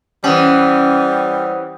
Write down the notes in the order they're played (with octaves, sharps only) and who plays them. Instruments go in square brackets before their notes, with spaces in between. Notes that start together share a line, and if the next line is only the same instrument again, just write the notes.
[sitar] E3 C#4 [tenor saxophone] G3 [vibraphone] C5 F#5 D#6